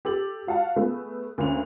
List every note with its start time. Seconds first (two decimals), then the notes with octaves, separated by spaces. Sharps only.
0.05 G4 A4 E6 A6 F#7
0.47 F#4 F5 F#5 A5
0.76 A3 B3 G#4
1.38 D2 A#3 C#4 F7